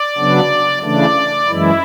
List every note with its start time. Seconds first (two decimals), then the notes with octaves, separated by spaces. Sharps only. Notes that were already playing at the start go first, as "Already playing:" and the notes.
Already playing: D5
0.17 C#3 F#3 B3 D4
0.82 C#3 E3 A3 D4 D5
1.48 F#2 E3 G#3 E4